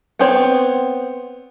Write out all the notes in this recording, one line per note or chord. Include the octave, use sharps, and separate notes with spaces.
B3 C4 C#5